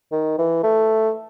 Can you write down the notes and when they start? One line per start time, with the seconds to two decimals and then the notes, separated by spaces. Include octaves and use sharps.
0.12 D#3
0.38 E3
0.64 A3